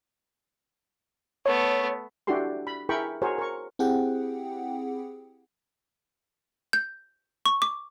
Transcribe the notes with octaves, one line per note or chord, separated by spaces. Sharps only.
A3 B3 C#5
D4 E4 F#4 G4 A4 C6
B5
E4 G#4 A#4 G5 B5 C#6
F#4 G#4 A#4 C5 C#5
A#4 C#6
C4 E4 G4 G#4 F#5 G5
G6
C#6
D6